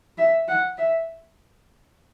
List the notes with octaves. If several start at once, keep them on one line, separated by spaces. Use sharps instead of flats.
E5
F#5
E5